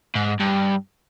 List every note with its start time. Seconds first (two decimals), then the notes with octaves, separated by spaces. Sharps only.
0.15 G#2
0.40 G2